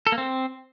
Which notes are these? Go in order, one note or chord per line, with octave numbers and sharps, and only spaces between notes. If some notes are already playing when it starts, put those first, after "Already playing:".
A4
A#3
C4